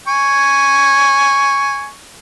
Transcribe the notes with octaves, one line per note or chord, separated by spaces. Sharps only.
G#5 C#6